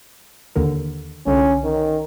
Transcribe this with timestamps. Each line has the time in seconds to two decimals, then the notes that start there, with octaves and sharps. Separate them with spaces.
0.56 D#2 D3 A#4
1.27 C2 D3 C#4
1.64 D#3